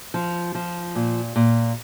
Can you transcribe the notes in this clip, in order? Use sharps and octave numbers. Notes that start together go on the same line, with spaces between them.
F3
F3
A#2
A#2